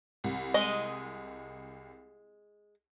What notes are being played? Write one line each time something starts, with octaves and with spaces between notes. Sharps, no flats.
C2
G#3 D#5